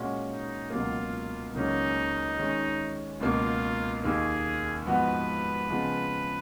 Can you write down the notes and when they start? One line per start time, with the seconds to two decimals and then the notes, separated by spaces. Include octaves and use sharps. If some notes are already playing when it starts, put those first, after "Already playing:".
Already playing: A#2 G#3 C#4 F#4
0.29 D#4
0.70 C#2 B2 F#3 A#3 F4
1.54 C#2 C#3 F#3 A#3 C#4 D#4
2.37 D#3 G#3 C#4
3.20 C#2 B2 A#3 F4
4.03 D#2 D#3 A#3 G#4
4.86 G#2 F3 B3 F#4 B4
5.69 C#3 F3 G#3 B3 F4